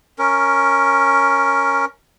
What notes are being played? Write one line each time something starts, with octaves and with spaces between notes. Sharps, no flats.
C#4 A#4